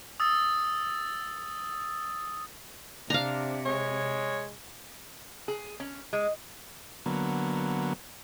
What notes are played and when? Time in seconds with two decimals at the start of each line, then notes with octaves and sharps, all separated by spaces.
0.20 D#6 E6 A6
3.10 C3 D4 F5 A#5
3.66 G#3 C#5
5.48 G#4
5.80 C#4
6.13 G#3
7.06 D3 F#3 A#3 B3